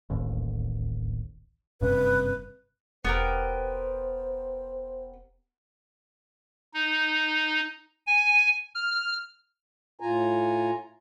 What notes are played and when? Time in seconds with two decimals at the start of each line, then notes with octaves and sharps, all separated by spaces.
0.10 D1 A1 D#2
1.81 F#1 G2 C3 B4
3.05 E1 B3 G4 A#4 C5
6.74 D#4
8.07 G#5
8.75 F6
10.00 A2 F4 G#5 A#5